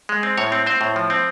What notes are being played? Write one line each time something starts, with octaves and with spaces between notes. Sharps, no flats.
G#3
C4
A2 C#5
C4
C4 C5
A2
F3
C4